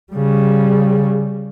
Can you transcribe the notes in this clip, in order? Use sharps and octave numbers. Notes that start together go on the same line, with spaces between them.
C#3 G3